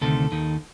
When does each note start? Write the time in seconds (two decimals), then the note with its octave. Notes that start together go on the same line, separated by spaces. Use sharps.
0.01 D2 C3 D#3 A4
0.32 D#2 D#3